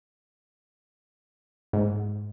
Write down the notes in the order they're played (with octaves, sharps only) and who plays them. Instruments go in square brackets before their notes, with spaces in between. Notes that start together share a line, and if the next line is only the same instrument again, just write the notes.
[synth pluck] G#2